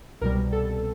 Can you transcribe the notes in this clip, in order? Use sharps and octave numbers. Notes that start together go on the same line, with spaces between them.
C2 B2 G3 A#4
A4